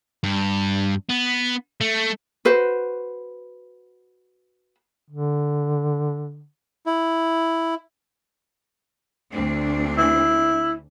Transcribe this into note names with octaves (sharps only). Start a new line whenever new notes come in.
G2
B3
A3
F#4 B4 C5
D3
E4
D2 C4 D4
E4